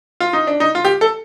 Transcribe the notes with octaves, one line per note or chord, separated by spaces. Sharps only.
F4
D#4
D4
D#4
F4
G4
A4